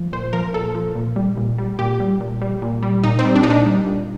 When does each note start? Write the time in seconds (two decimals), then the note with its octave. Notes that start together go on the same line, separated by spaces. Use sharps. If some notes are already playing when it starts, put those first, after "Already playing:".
Already playing: F3
0.13 A#2 C5
0.33 F3 A#4
0.54 A#2 A4
0.75 F3
0.95 A#2
1.16 G3
1.37 A#2
1.58 G3
1.79 A#2 G4
2.00 G3
2.20 A#2
2.41 G3
2.62 A#2
2.83 G3
3.03 A#2 D#4
3.19 C4
3.25 G3
3.35 D4
3.43 A#2 D#4
3.50 D4
3.66 G3
3.86 A#2